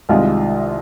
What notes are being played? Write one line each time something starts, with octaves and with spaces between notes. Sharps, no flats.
C2 C3 D#3 G#3 F4